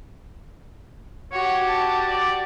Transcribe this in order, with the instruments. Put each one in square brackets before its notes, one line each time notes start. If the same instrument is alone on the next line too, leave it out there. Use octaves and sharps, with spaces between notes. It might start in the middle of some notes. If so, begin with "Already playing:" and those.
[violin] F#4 G4 [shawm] C#5
[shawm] A5
D5